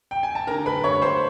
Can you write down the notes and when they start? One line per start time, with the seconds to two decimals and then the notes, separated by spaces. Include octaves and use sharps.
0.11 G5
0.23 G#5
0.35 A5
0.47 D3 A#4 A#5
0.66 B4 B5
0.84 G2 C#5 C#6
1.02 C5 C6